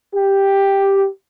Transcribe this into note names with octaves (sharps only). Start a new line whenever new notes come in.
G4